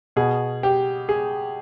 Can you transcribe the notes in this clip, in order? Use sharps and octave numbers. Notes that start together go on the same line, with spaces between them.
B2 G#4
G4
G#4